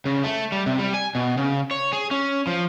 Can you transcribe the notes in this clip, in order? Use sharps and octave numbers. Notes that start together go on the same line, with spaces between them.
C#3
A3
G3
C3
G3
G#5
B2
C#3
C#5
G#4
C#4
F3